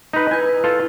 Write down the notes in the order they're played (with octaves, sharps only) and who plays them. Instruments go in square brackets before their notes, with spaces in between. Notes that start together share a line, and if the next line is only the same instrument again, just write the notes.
[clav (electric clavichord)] D#4 B4
[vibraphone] E4 B4 [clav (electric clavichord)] G#5
[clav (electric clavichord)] F4 A4